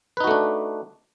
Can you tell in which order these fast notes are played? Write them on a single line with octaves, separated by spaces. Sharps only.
B4 D#4 F#4 A3 D4